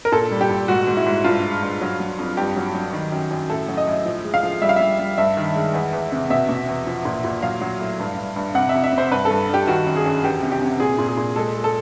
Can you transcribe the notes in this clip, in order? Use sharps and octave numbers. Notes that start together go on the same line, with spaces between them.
A#4
A#2 A4
G3
G4
A#2
G#2 F#4
G#2
E4
G#2
G2 F4
G#3
G2
F#3
F#3
F2
G2 G4
F#3
F#3
D#3
F#2
F#2
A2 A4
F#3
D#5
A2
F3
G#3
F5
F3
G3 E5
F5
G3 E5
G3
G2 E5
D#3
G#3
E2
E2
C3
B2 E5
B2
E2
F3
A#2
A#2
F#3 F5
F#3
A2
G2
G2
G2
C3 F#5
F2 E5
E5
C3
C5
G2 B4
A4
G2
G2 G4
D#3 F#4
F#2
G#4
F#2
E2 G4
C3
G4
C3
A#2 G#4
A#2
G#4
A#2
G#3 A4
G#3
A4